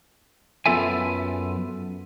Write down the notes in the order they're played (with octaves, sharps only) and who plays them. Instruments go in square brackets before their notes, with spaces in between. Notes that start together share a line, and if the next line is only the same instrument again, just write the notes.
[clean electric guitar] F#2 B3 F4 A4 E5 G#5